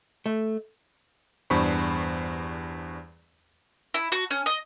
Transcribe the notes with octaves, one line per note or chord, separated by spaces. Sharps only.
A3
E2 G2 D4 C5 B5 C#6
E4
F#4
C#4
D#5